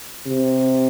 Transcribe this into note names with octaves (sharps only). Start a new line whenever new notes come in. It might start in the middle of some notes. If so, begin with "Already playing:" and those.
C3